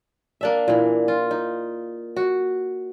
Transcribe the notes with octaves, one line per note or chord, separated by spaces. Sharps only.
A#3 D4 E5
A#2 E3
F4
D#4
F#4